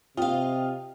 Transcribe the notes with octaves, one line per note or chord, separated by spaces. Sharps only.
C3 F4 D#5 F5 G5